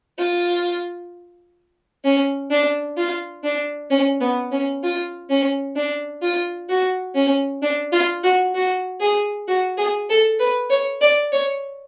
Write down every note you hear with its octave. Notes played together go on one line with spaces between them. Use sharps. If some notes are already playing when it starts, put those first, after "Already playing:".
F4
C#4
D4
F4
D4
C#4
B3
C#4
F4
C#4
D4
F4
F#4
C#4
D4
F4
F#4
F#4
G#4
F#4
G#4
A4
B4
C#5
D5
C#5